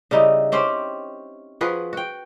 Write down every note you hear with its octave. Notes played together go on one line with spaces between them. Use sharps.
C#3 G3 D#4 E4
C4 C#4 G4 C5
F3 F#4 G#4 B4
F#4 G5